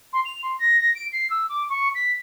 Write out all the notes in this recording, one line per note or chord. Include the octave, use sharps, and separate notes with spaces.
C6
F7
C6
A#6
A#6
D7
C7
E6
D6
C#6
B6